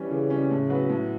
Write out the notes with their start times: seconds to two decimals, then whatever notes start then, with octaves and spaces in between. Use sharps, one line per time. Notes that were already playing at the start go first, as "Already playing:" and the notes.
Already playing: E3 G3 C#4
0.10 C#3 E3
0.30 G3 C#4
0.51 A2
0.69 F#3 B3 F#4 B4
0.90 A2